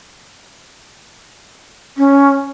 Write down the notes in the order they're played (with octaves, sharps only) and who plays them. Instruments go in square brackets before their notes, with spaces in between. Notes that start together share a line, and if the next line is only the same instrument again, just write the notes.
[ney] C#4